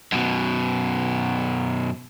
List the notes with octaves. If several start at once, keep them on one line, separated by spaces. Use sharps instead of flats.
F#2 B2